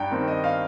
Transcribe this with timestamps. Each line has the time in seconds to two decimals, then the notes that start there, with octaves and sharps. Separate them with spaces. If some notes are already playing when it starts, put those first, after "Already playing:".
Already playing: G2 G5 A#5
0.11 D#3 C4
0.28 D#5
0.44 F5